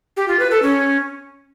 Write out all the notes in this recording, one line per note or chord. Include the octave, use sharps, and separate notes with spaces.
G4
F4
B4
A4
C#4